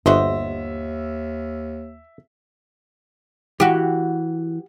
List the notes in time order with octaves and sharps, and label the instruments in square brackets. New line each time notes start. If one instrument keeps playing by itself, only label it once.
[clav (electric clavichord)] G1 [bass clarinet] D#2 [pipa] F#4 C5 D#5 [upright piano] E5
[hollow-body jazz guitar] E3 [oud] F#4 G4